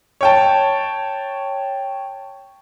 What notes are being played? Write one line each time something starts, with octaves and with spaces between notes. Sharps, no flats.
C#5 G5 A5